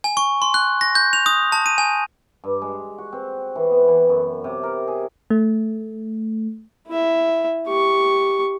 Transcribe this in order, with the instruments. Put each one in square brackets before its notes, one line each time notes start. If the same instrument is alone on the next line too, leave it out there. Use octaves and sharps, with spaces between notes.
[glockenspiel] G#5
C#6
C6
F#6
A#6
G6
F7
D#6
A5
D#7
G#5
[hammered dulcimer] G2
G#3
F#4
C4
E3
B3
E3
F#2
C3
A#4
G#4
[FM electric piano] A3
[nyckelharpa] E4 E5
G4 C#6